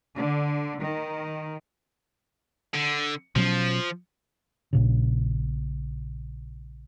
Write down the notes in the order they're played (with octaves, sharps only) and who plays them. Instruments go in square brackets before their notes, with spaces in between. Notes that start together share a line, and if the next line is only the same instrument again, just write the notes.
[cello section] D3
D#3
[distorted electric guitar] D3
[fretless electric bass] B2 F#3 C#4 [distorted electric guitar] F3
[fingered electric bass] A#1 A#2 C#3